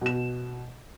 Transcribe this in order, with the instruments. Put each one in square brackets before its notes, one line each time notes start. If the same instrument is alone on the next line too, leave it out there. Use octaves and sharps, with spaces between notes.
[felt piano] B2 E7